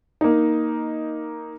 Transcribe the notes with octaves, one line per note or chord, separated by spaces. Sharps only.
A#3 D#4